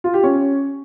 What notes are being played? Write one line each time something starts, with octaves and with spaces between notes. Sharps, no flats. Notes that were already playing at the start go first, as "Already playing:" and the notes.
F4
G4
C#4